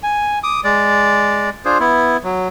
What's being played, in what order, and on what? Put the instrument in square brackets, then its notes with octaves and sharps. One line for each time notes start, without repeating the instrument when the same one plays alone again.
[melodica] G#5
D6 D#6
G#3 D5
D4 F4 G#4 C5
B3 E4
F#3